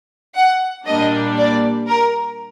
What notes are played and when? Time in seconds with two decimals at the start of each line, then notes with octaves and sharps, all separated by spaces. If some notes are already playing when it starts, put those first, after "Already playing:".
0.35 F#5
0.86 A#2 G3 A#3 D4 D#5
1.38 D5
1.87 A#4